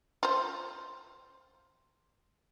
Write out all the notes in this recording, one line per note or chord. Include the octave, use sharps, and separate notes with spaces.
F4 C5